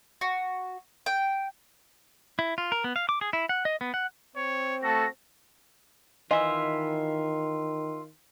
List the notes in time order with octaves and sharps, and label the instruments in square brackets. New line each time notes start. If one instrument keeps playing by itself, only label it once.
[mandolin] F#4
G5
[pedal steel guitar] E4
F4
A#4
B3
F5
D6
G#4
E4
F#5
D#5
B3
F#5
[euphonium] C4 [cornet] C#5
[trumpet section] A3 A4 [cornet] F#4 [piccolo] A#6
[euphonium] D#3 [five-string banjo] E3 D#5 [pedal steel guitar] F4 E5